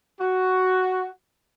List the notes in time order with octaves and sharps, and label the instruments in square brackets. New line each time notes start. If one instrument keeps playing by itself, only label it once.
[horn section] F#4